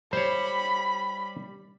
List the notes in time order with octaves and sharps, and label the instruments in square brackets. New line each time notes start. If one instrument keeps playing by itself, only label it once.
[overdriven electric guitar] G3 [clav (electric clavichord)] C5 C#5 [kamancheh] B5